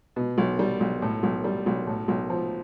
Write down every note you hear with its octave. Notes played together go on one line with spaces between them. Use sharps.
B2
B1
G3
B1
A2
B1
G3
B1
A2
B1
F3